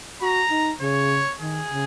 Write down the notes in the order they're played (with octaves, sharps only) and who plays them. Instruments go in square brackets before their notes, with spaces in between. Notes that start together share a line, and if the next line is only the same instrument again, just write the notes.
[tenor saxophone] F#4 [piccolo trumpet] A#5
[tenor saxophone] D#4
[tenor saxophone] C#3 [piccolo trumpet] C#5
[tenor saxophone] D#3 [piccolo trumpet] G#4
[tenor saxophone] C#3